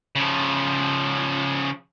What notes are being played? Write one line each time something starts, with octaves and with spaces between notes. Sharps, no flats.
C#3 F3